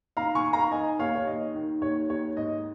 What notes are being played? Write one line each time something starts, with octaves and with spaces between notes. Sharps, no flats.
D#3 F5 A#5
G#5 C#6
D#3
F5 A#5
D#3 D#5 G#5
D#2 C#5 F5
C#5
D#2 D#5
D#3
D#2 C#5
D#2 C#5
G#2 D#5